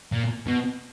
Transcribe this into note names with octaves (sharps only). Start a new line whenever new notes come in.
A#2
B2